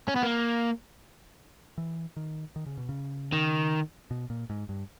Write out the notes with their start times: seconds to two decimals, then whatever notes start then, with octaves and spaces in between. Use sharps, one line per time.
0.08 C#4
0.16 B3
0.23 A#3
1.78 E3
2.16 D#3
2.56 D#3
2.66 C#3
2.77 B2
2.89 C#3
3.32 D#3
4.11 B2
4.30 A#2
4.50 G#2
4.69 G2